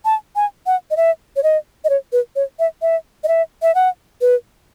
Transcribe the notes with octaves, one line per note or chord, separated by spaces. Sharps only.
A5
G#5
F#5
D#5
E5
C#5
D#5
D#5
C#5
B4
C#5
E5
E5
D#5
E5
E5
F#5
B4